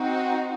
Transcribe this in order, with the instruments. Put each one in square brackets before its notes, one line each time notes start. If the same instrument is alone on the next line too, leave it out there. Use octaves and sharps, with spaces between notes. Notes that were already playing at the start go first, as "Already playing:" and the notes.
Already playing: [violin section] C4 D#4 F#4